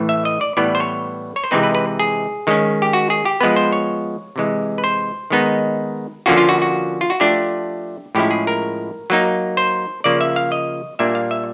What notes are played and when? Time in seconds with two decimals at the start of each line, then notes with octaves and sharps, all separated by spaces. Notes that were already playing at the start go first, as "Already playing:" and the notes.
Already playing: A2 E3 A3
0.09 E5
0.25 D#5
0.41 D5
0.57 A2 E3 G3 B3 D5
0.75 C5
0.80 C#5
1.36 C#5
1.44 C5
1.51 C3 E3 G#3 C4 D#4 B4
1.63 B4
1.75 B4
2.00 G#4
2.47 D#3 G#3 C#4
2.82 G4
2.93 F#4
3.10 G#4
3.25 G4
3.41 F3 G#3 B3 B4
3.56 C5
3.73 C#5
4.36 C3 E3 G#3
4.78 B4
4.84 C5
5.30 D#3 G#3 B3 D#4
6.26 D3 F3 A#3 C#4 F4 F#4
6.38 F4
6.49 F#4
6.62 F#4
7.01 F4
7.10 F#4
7.20 F3 A3 D4 F4 G4
8.15 A2 F3 G#3 C#4 E4 G4
8.31 G#4
8.47 A#4
9.10 F#3 A#3 D#4
9.57 C5
10.04 C#3 F3 A#3 D5
10.21 E5
10.36 F5
10.52 D#5
10.99 A#2 G3 A#3 D4 E5
11.15 F5
11.31 E5